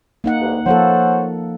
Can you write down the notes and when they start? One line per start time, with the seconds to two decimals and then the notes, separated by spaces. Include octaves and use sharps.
0.24 A#3 D#4 F#5
0.41 D2 G2
0.66 F3 A#3 A4 C5 C#5 F#5